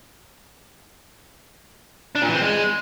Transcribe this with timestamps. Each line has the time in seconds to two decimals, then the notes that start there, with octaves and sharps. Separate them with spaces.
2.15 D4
2.22 A#2
2.28 E3
2.35 C4
2.42 G#3